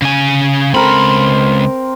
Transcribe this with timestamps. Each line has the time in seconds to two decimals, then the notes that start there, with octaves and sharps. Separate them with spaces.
0.02 C#3 G#5
0.74 C#2 C4 A#4 B5